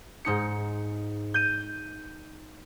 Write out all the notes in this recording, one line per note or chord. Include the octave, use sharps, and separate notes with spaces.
G#2 D#4 C#7
G6 D#7